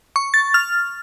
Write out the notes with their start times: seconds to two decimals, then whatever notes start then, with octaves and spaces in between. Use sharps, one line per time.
0.16 C#6
0.34 A6
0.54 F6